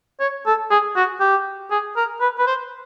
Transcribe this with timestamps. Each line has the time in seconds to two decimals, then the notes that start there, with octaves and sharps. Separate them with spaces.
0.20 C#5
0.46 A4
0.71 G#4
0.96 F#4
1.20 G4
1.71 G#4
1.96 A#4
2.21 B4
2.38 B4
2.47 C5